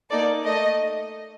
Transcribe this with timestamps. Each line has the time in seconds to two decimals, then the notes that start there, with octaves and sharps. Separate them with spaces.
0.10 A#3 D#4 A4 D5
0.44 A3 D#5